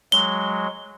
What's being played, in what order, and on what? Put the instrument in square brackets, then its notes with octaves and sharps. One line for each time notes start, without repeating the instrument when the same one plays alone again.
[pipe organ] F#3 G#3 [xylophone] G7